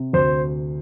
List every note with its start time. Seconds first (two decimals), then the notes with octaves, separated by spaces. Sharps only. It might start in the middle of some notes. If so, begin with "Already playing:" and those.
Already playing: C3
0.13 D2 C5